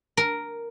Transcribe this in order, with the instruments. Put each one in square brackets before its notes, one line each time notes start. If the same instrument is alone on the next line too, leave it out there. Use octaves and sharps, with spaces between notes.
[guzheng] A#4